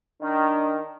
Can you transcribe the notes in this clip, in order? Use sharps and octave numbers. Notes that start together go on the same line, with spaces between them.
D#3 D4